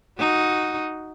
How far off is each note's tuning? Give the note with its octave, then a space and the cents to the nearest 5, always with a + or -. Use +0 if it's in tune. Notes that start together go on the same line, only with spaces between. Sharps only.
D#4 +0 F#4 +0